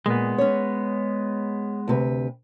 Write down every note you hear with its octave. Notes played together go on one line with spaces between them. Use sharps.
A#2 G#3 B3
C#4 C#5
D2 C3 B4